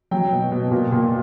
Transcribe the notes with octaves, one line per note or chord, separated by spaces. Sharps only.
F#3 G5
B2
B2
A#2
A#2